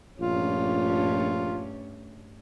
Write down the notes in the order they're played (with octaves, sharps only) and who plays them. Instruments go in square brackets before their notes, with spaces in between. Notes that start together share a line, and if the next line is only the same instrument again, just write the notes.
[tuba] A#1 [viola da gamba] G2 A3 C#4 [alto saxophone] F4